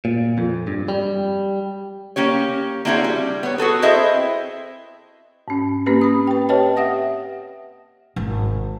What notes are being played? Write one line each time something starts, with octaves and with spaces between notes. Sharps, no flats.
A#2
F2
G2
G3
A#3 C#4 G4 C#5
A#3 C4 D4 E4 F#4 G#4
G3
B3 C#5
F#4 G#4 A4 B4
C4 E4 G#4 C5 D#5 E5
G#2 C#4
A#3 C4 C#4 G4 B4
B5 D#6
B4 G5
G4 B4 C#5 D#5 G5 A5
E5 F#5 D#6 A#6
G#1